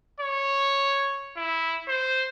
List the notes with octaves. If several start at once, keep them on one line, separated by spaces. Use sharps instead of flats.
C#5
E4
C5